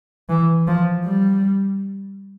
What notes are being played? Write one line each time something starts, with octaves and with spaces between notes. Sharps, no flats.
E3
F3
G3